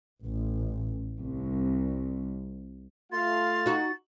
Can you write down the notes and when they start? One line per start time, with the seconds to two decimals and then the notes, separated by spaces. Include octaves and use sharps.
0.23 A1
1.19 C2
3.12 A3 F4 F5 C6 A6
3.66 D#4 F#4